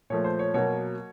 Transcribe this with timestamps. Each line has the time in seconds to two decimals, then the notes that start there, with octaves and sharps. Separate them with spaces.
0.10 A#2 F3 A3 C#5
0.24 C5
0.39 C#5
0.54 B2 F#3 A#3 C#5